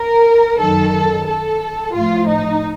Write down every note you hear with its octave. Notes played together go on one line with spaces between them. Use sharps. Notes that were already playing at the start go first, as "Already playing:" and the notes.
Already playing: A#4
F#2 D#3 A4
A4
A2 F3 F4
D#4